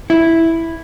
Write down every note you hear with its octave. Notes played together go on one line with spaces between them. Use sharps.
E4